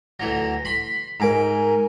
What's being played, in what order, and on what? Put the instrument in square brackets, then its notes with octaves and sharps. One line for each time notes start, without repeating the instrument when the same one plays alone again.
[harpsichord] D2 E3 F#3 [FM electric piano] A#6
[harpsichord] B5 C6
[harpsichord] G#2 D6 [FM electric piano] A#4 G#5 A#5